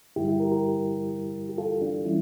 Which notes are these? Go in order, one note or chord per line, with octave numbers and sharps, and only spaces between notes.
G2 D3 G3 E4 G4
E4 G4
G4 A#4
G4 A#4
G4
F4 A4
D4 F4
E3 G3 C#4 E4